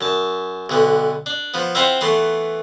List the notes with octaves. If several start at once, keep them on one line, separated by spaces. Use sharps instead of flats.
F#2 A5
B1 D3 B3
D4
F3 B3
C4 E4 F4 C5 E5 F#5
E3 A3 B3 C6